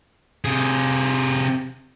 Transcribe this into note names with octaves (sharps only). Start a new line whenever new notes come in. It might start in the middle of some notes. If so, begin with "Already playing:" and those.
C3 G#4